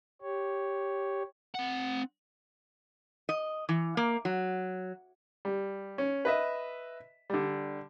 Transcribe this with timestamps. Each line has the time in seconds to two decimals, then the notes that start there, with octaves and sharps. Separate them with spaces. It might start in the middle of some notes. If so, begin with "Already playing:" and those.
0.22 G4 C#5
1.55 C4 F#5
3.29 D#5
3.69 E3
3.97 A#3
4.25 F#3
5.45 G3
5.98 C#4
6.25 B4 D#5 E5
7.30 D3 G3